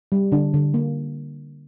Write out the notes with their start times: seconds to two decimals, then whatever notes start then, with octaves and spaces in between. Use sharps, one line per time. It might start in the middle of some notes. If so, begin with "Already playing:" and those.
0.12 G3
0.32 D3 D4
0.54 D3
0.74 A#3